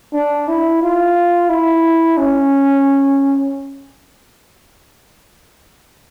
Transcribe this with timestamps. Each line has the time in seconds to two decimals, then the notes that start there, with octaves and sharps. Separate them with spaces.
0.13 D4
0.48 E4
0.82 F4
1.49 E4
2.18 C#4